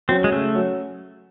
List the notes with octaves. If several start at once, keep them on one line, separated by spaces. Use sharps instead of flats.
F#3 C4 C#4 F#4 C#5
G#3
C#3 A3
F#3 C#4 F#4 C#5